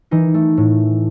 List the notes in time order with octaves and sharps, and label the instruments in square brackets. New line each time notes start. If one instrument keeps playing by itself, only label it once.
[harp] E3 D#4
A3
A2